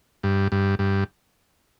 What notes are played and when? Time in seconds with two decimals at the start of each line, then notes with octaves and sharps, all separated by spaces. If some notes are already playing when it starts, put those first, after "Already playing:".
0.24 G2
0.52 G2
0.79 G2